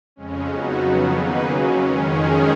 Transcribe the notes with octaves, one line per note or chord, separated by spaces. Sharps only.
F2 C#3 G#3 C#4
F#3 B3 D#4 F#4
F2 C#3 F#3 B3
D#3 A#3 D#4 G#4 B4
C#3 F#3 C#4
D#3 G#3 C#4
F2 D#3 G#3 C#4 G#4